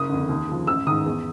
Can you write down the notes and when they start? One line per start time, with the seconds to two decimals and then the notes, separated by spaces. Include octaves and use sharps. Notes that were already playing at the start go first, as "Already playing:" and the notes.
Already playing: F#1 D#6
0.09 F2 D3
0.29 D#2
0.48 C#3 F3
0.67 A1 E6
0.87 G#2 D#3 D#6
1.06 E2